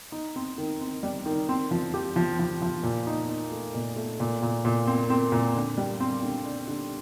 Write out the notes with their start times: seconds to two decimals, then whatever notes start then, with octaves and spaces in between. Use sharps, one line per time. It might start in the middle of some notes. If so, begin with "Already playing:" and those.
0.12 D#4
0.36 C4
0.58 D#3
0.81 C4
1.03 G3
1.26 D#3
1.49 C4
1.71 F3
1.94 G4
2.16 F3
2.39 F3
2.62 F3
2.83 A#2
3.07 D#4
3.29 D#4
3.52 A3
3.75 A#2
3.96 A3
4.20 A#2
4.42 A#2
4.65 A#2
4.87 C4
5.10 C4
5.32 A#2
5.55 D3
5.78 G3
6.00 C4
6.23 D3
6.45 D3
6.68 D3